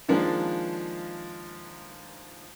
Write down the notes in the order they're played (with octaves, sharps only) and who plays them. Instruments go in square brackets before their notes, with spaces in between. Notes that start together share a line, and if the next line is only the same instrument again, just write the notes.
[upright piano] D#3 F3 G#3 A#3 D4 F4